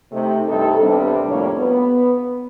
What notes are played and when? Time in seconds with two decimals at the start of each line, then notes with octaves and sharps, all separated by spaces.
0.12 C3 A3 D#4
0.48 G2 C3 D#4 A4
0.81 D#2 C3 G3 A#3 B3 D4
1.30 F2 A2 G3 A#3 C#5
1.59 B3